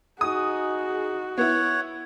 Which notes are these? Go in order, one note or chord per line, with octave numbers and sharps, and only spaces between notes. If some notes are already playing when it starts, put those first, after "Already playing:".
D#4 F#4 G#4 D#6
B3 E4 C#5 F#5